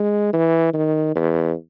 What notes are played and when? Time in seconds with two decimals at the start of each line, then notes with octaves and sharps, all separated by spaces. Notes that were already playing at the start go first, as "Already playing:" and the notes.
Already playing: G#3
0.33 E3
0.74 D#3
1.15 E2